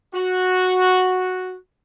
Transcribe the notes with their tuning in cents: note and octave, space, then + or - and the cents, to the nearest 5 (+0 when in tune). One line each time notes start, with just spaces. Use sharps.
F#4 -5